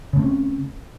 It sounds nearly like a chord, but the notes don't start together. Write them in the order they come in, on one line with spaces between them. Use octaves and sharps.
C#3 A3 C4 C#4